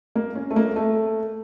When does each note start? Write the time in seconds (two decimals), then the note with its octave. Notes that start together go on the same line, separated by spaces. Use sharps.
0.15 A#3
0.35 C#4
0.51 A3
0.56 A#3
0.76 A3